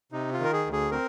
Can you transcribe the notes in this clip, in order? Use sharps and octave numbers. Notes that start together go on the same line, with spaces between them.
C3 D#4
F4
D#3
A#4
G#4
D2
G#4
C4 A#4